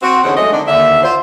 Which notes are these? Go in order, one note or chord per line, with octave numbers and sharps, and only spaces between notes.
C4 F#4
E2 D3 C4 C#4 D#4 F#5
F#3 G#3 A3 F#4 D#5
D3 D#3 C4 D4
D#2 D3 E5
F4 C5